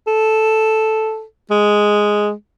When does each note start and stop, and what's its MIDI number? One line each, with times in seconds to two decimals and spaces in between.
0.07 1.24 69
1.51 2.32 56